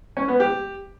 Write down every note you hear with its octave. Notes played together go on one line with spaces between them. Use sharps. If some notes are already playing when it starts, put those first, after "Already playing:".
C#4
B3
G4